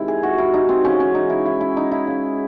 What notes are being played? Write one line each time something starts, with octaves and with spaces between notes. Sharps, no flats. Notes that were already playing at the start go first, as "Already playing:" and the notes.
Already playing: C3 D#3 G#3 E4
G#4
F#4
E4
D#4
C4
C#3 E3 G#3 C#4
C#4
D#4
E4
E4
E4
D#4
E4
C#3 G#3